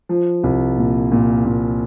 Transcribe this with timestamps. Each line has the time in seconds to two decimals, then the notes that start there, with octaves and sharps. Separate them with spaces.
0.09 F3
0.43 C2
0.77 A#2
1.12 A#2
1.45 A#2